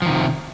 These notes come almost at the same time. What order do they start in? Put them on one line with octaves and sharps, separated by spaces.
F3 D#3 C3